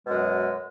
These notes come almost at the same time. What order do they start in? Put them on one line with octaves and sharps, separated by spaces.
B2 G#3 F#2